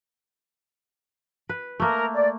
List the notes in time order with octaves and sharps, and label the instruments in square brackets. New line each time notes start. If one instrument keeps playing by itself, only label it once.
[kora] B4
[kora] A3 A#3 [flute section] A#4
[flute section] D5